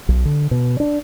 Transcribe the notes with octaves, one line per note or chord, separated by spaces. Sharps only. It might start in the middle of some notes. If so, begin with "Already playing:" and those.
B1
D3
B2
D4